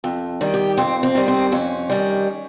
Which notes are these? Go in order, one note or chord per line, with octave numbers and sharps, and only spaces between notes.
F2
D#3 G3
G4
F2 C4
C4
D#3 G3
C4
F2 C#4
D#3 G3